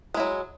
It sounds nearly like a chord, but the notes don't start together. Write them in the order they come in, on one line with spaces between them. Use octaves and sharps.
G#3 E4 F#3